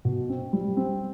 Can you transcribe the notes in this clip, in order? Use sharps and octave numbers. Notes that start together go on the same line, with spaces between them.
B2
C4
G3
C4